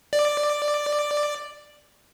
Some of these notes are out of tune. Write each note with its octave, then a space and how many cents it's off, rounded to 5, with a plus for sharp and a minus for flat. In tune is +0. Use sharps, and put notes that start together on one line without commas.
D5 +5